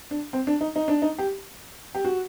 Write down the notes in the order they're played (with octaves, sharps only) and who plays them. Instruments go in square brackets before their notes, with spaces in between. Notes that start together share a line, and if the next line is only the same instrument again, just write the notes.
[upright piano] D4
C4
D4
D#4
D#4
D4
D#4
G4
G4
F#4